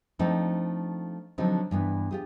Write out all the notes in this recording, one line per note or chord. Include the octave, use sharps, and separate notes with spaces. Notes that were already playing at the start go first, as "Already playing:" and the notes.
F3 A3 C4 D4 D#4
D3 F3 F#3 C4 D#4
G2 E3 B3
F4 G4 G#4